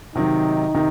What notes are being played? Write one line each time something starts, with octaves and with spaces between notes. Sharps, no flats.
C3 D#3 F#3 D#4
C3 D#3